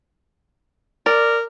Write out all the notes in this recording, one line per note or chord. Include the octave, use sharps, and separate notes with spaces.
A#4 D5